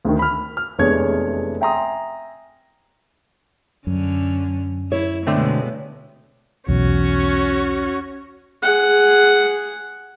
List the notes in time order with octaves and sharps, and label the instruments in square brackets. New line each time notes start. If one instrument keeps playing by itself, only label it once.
[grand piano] D2 D3 D#3
B5 F6
F6
F1 E2 G#3 D4 C#5 G#6
E5 G5 G#5 A#5 C6 D#6
[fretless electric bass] F#2 [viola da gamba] D3 C#4
[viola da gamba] E4 [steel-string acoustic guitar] C#5
[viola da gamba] B2 G#3 B3 [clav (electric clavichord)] D3 A3 C4
[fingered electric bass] B1 E2 [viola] C#4 F#4
[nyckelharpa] G#4 F#5